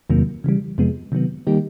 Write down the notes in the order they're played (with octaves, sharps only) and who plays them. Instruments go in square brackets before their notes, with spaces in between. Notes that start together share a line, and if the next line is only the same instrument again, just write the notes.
[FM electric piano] E2 C3 D#3 F#3 A#3
C#3 E3 G3
F2 C3 F3 G#3 B3
C3 D#3 F#3 B3
D#3 G3 A#3 D#4 G4